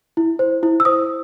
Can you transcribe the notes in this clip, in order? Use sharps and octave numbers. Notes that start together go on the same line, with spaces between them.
E4
C5
E4
E6
C5 D#6